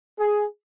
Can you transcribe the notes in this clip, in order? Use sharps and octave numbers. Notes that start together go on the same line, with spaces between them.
G#4